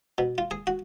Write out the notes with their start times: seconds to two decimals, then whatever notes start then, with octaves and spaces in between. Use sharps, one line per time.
0.18 B2
0.38 F4
0.51 G#4
0.67 F#4